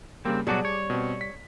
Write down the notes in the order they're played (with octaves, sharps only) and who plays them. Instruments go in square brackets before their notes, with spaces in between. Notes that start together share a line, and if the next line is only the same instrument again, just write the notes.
[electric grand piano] C#3 G3 A#3 [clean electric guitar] C4
[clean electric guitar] B2 F#3 F#4 [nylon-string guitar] G3 [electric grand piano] G#4 A5 D6
[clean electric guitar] C#5
[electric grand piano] B2 C4
B6